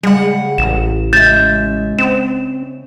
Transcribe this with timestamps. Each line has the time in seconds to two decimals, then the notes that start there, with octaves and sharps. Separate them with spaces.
0.03 C#3 G3 G#3 F#5
0.58 A1 E7
1.13 C#3 G#3 E5 G6 A6 E7
1.99 C4 E7